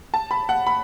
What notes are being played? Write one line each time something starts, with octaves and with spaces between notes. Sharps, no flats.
A5
B5
F#5
B5